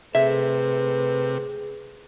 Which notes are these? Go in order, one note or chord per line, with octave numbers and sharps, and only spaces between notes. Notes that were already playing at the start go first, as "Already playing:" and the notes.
C3 A3 G#4 A4 B4 E5